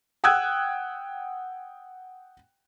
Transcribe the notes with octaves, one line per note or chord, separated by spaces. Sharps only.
F#5 G5 D#6 E6 F#6 G#6